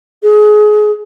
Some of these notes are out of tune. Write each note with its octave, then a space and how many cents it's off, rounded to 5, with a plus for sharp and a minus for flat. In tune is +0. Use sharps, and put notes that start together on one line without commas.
G#4 +25